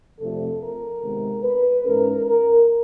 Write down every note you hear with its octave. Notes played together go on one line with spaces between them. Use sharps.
F2 C3 F3 A3 D4 A4
A#4
C3 D#3 G#3 B3
B4
G#2 E3 G#3 C#4 A#4
A#4